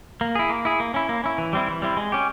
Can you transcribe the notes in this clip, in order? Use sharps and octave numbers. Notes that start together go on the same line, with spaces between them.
A#3
E4 G#4
A#3
E4 G#4
A#3
C#4 E4
A#3
C#4 E4
E3
G3 C4 E4
E3
G3 C4 E4
G#3
C#4 G4